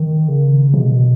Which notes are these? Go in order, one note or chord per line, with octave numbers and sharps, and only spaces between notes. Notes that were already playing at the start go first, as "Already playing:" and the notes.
Already playing: D#3
C#3
B2